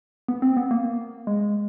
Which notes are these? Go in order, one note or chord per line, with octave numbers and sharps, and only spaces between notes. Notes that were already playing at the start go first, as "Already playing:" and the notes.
B3
C4
B3
A#3
G#3